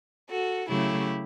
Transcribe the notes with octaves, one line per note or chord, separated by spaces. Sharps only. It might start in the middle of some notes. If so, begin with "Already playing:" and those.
F#4 A4
C#3 F#3 A3 E4 G4